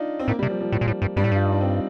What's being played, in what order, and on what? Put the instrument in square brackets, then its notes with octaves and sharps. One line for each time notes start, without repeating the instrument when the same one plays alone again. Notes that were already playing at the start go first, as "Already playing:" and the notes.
Already playing: [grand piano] D4 D#4 F4
C4
[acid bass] A2 [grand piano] A#3
[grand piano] G3
[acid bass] C3
[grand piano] F3
F3
[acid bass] A2
A#2
A2
G2
[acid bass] G2 [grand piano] G3
[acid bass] A2
[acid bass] G2 [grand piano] F4
[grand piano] D#4
D4
C4